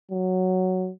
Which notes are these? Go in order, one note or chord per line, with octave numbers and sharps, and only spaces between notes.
F#3